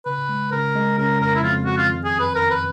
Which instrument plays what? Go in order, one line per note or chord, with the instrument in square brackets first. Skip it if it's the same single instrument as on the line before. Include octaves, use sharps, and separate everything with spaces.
[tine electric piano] C#3 [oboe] B4
[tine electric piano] G#3
[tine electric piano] C#3 [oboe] A#4
[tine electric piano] G#3
[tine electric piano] C#3 [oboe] A#4
[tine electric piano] F2 [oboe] A#4
[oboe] E4
[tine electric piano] F2 [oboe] F4
[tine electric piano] F2 [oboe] F#4
[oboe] F4
[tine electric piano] D#3
[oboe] G#4
[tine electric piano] F#2
[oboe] B4
[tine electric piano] D#3 [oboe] A#4
[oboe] B4